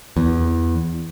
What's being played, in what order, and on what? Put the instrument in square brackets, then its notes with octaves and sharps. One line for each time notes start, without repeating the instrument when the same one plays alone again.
[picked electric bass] E2